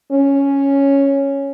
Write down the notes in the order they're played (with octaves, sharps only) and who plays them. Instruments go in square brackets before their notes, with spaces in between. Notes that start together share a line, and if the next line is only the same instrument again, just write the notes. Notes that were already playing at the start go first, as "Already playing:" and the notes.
[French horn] C#4